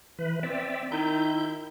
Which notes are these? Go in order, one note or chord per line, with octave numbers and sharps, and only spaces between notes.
E3 B4
C4 D5 E5
D#3 E4 G6